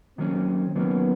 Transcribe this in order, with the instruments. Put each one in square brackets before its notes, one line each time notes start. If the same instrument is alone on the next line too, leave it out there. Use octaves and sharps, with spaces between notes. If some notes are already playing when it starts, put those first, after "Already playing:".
[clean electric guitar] D#3 F#3 A#3 C#4 [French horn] C4
[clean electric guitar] D#3 F#3 A#3 C#4 [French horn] B3